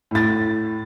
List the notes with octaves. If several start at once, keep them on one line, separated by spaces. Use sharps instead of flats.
A2 A6